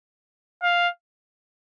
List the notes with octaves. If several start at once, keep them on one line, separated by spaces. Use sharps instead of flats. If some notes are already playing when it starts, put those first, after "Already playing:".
F5